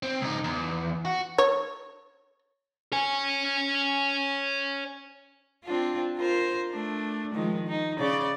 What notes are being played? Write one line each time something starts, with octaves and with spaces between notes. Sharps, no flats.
C4
C#2 D#4
E2
F#4
C#5
C#5 G#5
C4 D4 F4
F4 A#4 C5
A3 D4
D#3 F3 G#3
D#4
C#3 D5